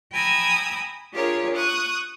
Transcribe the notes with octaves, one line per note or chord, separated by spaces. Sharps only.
G5 G#5 A#5 B5 D#6 E6
D4 F4 G4 G#4 A#4 C#5
C#6 D#6 F#6